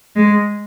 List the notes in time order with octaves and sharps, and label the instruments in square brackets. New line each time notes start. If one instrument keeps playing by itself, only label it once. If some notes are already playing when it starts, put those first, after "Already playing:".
[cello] G#3